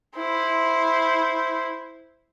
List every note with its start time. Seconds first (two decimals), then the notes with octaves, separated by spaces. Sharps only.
0.16 E4 C5